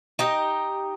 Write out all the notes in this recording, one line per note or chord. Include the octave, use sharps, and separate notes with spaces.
D#4 G4 D#5